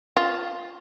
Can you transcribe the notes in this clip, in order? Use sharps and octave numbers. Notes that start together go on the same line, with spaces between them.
F4